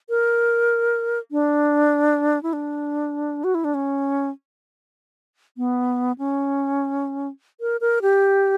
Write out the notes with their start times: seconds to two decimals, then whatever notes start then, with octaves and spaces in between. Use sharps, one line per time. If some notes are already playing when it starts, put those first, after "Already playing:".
0.09 A#4
1.32 D4
2.43 E4
2.53 D4
3.44 F#4
3.55 E4
3.64 D4
3.74 C#4
5.57 B3
6.18 C#4
7.61 A#4
7.81 A#4
8.02 G4